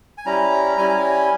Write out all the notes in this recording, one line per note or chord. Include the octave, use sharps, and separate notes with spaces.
G#5
G3 C#4 E4 A#5
G3 C#4 E4 G#5
A#5
G#5